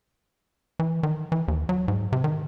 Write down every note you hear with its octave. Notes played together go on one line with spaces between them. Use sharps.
E3
D#3
E3
D#2
F#3
G#2
C3
D#3